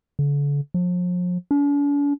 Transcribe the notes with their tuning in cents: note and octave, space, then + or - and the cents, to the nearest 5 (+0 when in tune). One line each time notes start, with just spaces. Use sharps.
D3 -40
F3 +40
D4 -45